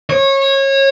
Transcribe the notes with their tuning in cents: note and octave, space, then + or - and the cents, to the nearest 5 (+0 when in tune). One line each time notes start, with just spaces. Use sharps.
C#5 -25